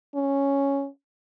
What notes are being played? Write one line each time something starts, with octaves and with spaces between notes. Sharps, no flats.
C#4